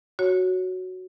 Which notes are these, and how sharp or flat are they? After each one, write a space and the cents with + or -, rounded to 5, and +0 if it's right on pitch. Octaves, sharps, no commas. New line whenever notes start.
F#4 +0 C#5 +0